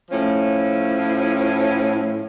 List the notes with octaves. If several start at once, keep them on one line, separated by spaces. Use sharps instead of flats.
A2 F3 C#4